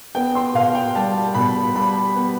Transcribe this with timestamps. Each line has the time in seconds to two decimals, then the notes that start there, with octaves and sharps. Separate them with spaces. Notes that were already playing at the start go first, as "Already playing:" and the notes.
0.15 B3 G5
0.35 C6
0.54 B2 F5
0.75 G5
0.95 G3 A5
1.35 B2 B5
1.75 G3 B5
2.15 B3